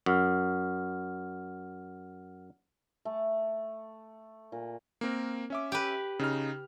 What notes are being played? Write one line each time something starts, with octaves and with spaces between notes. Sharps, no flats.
F#2 F#5 F6
A3
A#2
A#3 C4 A#4
C#4 E5 D6
G4 B4
C#3 D#4 F6